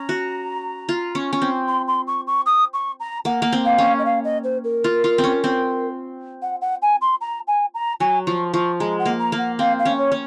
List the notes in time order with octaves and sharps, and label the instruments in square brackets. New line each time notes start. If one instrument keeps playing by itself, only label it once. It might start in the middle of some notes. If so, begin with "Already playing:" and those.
Already playing: [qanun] C#4 [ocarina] A#5
[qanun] F#4
F4
C#4
C#4
C4
[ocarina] C6
C6
C#6
C#6
D#6
C#6
A#5
[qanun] A#3 [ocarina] F#5
[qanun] A#3
C4
[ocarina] F5
[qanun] C#4
[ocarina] D#5
F5
D#5
C5
A#4
[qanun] F4
F4
C4
C#4
C4
[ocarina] F#5
F#5
G#5
C6
A#5
G#5
A#5
[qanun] F#3 [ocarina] G#5
[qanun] F3 [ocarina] C#6
[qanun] F3 [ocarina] C#6
[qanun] G#3 [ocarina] A#5
[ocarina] F#5
[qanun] A#3
[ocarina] A#5
[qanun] A#3
[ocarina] F#5
[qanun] C4 [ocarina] F5
[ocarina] F5
[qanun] C#4
[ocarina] C#5
[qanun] C#4